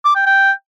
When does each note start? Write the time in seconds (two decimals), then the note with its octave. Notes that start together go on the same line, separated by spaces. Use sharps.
0.05 D6
0.15 G5
0.26 G5